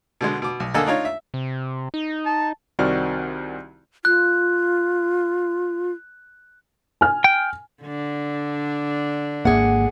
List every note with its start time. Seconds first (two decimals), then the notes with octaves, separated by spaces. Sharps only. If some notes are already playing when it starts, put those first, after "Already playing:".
0.21 B2 D3 G#3
0.42 B2 D6
0.60 B1
0.74 D3 A#3 A4 D#5 G#5 E6
0.86 D4 D#4 F4 C#5
1.05 E5
1.34 C3
1.94 D#4
2.26 A5
2.79 C2 D#3 C4 F#4 D5 F6
4.05 F4 F#6
7.01 G#5 F6
7.24 G5
7.83 D3 D4
9.45 G#1 D#2 A#3 G#4 F#5